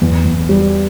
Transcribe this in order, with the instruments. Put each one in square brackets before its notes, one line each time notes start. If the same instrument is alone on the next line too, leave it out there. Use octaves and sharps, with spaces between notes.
[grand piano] E2
E2
G3